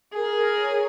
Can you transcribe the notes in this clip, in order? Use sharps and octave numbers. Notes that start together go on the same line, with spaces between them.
G#4 A#4
A#4
C#5